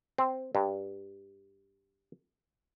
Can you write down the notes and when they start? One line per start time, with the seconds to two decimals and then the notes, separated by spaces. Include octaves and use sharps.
0.18 C4
0.55 G2